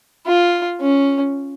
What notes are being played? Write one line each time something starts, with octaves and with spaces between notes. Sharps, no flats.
F4
C#4